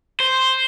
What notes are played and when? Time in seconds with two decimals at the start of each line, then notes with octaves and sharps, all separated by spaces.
0.20 C5